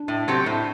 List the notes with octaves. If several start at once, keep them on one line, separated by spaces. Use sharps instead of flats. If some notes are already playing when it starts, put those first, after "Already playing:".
Already playing: D4
A2
F#3 A3 C4 G4
A2